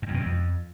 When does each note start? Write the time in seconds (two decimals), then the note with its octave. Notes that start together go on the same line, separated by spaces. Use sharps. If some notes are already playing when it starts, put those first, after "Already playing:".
0.02 F#2
0.08 F2
0.14 B2
0.20 F2